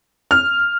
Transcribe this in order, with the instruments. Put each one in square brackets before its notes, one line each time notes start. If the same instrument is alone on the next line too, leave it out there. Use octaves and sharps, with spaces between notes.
[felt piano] F6